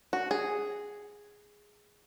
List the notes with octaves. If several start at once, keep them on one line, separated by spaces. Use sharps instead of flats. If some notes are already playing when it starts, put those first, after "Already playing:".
F#4
G#4